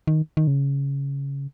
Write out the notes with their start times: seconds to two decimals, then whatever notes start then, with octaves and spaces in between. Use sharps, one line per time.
0.07 D#3
0.37 D#3
0.47 C#3